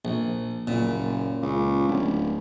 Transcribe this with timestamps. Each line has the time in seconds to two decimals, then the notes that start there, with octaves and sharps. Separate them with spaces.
0.05 A#1
0.67 F#1 A#2
1.42 C#2
1.88 D1